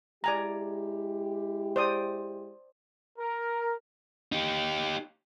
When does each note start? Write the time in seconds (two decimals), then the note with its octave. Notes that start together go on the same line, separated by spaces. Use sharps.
0.24 G#3 E4 G4 D5 G#5 A#5
1.76 C5 D5 D#6
3.19 A#4
4.32 D#4 G4